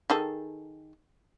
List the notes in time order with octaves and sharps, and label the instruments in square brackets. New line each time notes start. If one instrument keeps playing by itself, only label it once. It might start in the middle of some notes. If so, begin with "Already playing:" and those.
[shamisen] D#3 G#4 A4